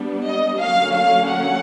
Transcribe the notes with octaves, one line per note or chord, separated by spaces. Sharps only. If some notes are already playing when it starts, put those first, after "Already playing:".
Already playing: G3 B3 D4
D#5
D3 F#3 A#3 C#4 F5
F5
F#5